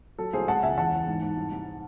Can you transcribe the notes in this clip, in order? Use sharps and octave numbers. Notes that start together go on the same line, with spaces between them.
F#3 A4
C2 G#4 C5
G#3 F#5 A5
C#2 E5 G#5
E2 F#5 A5
E2
G#2
G#2
C2
C2